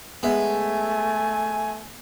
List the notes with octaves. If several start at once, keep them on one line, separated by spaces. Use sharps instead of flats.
G#3 A3 B3 E5 G#5